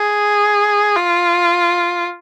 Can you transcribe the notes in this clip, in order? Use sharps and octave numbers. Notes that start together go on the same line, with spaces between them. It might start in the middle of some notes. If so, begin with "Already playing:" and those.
Already playing: G#4
F4